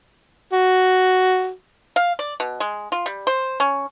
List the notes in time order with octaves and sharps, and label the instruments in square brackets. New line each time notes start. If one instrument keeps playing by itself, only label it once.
[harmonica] F#4
[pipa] F5
D5
B2
G#3
F4
G3
C5
C#4